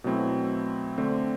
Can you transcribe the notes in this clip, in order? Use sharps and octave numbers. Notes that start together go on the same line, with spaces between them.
B2 F#3 A3 C4 E4
D3 A3 C4